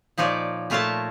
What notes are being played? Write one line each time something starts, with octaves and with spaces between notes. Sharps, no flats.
A#2 F3 D#4 C#5 D5
A#2 A3 F4 A#4 C#5 A5